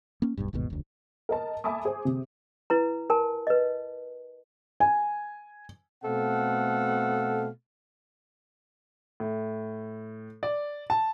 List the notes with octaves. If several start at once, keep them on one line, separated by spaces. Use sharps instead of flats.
A#3 C#4
D1 B1 G2
G1 D#2 G#2 B2
F1 D2
A#4 D#5 A5
E5 G#5 A5 B5 D6 D#6
G#4 C5
C3
E4 B4 A#5
A#4 G#5 A5
B4 D#5
G#5
B2 A3 C4 A4 F5 F#5
A2
D5
A5